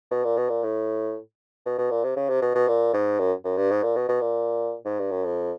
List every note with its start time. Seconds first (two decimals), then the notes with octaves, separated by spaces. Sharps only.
0.11 B2
0.24 A#2
0.37 B2
0.49 A#2
0.63 A2
1.66 B2
1.78 B2
1.90 A#2
2.03 C3
2.16 C#3
2.29 C3
2.42 B2
2.55 B2
2.68 A#2
2.94 G#2
3.19 F#2
3.45 F#2
3.57 G2
3.71 G#2
3.83 A#2
3.96 B2
4.08 B2
4.21 A#2
4.85 G#2
4.99 G2
5.11 F#2
5.25 F2